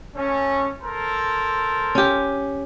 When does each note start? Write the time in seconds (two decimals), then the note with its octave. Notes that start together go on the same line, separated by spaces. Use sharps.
0.16 A3 C#4
0.81 A4 A#4 C5
1.95 C#4 G4